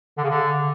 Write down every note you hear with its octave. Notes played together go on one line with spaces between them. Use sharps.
D3
C#3
D3